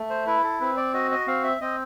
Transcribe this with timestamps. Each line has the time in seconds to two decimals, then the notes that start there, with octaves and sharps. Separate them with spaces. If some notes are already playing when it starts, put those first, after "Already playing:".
Already playing: A3
0.10 C5
0.27 E4 B4
0.44 A4
0.60 C4 B4
0.77 D5
0.94 F#4 D#5
1.11 D#5
1.27 C4 F5
1.44 E5
1.61 C4 D#5